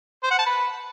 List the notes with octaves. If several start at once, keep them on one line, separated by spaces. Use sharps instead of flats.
C5
F#5
A5
B4